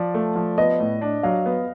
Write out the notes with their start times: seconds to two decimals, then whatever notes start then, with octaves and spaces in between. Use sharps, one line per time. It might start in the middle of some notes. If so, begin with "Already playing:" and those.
Already playing: F3 D5
0.14 A3
0.35 F3
0.58 B3 D#5
0.80 A2
1.01 D4
1.23 F#3 F5
1.46 B3